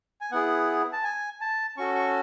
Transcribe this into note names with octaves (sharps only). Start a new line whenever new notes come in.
G#5
B3 E4 G#4 F#5
A5
G#5
A5
C#4 F#4 A4 C#6
C#6